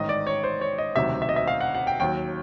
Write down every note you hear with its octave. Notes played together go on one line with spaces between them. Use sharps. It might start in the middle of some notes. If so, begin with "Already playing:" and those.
Already playing: A1 G#2 D#3 D#5
D5
C#5
C5
C#5
D#5
E1 D2 C3 D#3 F#3 E5
E5
D#5
E5
F5
F#5
F#5
G5
D#2 D#3 F#3 G5